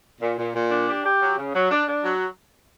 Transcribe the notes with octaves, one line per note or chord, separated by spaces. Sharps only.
A#2
A#2
A#2
D4
G4
G4
F#3
C#3
F#3
D4
D4
F#3